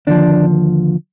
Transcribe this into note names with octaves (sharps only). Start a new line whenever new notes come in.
D#2 D3 F3 D4